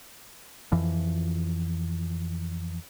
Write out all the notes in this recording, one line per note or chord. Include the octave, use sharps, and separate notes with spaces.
F2 E3 F3